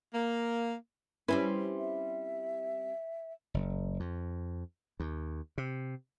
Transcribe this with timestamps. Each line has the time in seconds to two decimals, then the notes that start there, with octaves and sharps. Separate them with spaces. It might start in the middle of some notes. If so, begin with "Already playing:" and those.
0.13 A#3
1.28 G3 C4 C#4 E4 B4
1.78 E5
3.54 F#1
4.00 F2
5.00 D#2
5.58 C3